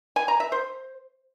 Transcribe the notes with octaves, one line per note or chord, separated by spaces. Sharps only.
G#5
A#5
E5
C5